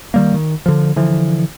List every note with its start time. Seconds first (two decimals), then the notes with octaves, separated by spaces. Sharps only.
0.14 D#3 G3 A#3
0.34 D#3
0.66 D3 F3
0.96 D3 E3 F3